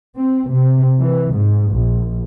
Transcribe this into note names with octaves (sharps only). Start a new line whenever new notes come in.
C4
C3
E3
G#2
A#1